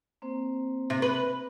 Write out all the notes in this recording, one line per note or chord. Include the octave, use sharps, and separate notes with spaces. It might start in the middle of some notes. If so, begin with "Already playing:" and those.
A#3 C4 C5
C3
B4